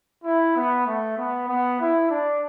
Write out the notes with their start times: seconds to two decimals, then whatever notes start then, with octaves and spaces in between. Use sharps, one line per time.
0.24 E4
0.56 B3
0.86 A3
1.17 B3
1.48 B3
1.80 E4
2.10 D4